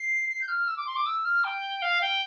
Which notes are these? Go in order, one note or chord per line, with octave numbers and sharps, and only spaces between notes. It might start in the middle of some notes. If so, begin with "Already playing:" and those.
Already playing: C7
C7
G6
F6
E6
D6
C6
D6
E6
F6
G5
F5
G5